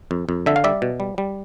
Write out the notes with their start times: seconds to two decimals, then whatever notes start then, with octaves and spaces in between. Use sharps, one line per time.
0.11 F2
0.29 F2
0.46 D3 E5
0.56 F5
0.64 G3 D5 E5
0.82 B2
1.00 G3
1.18 G3